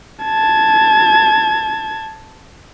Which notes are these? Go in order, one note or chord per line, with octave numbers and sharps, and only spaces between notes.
A5 G#6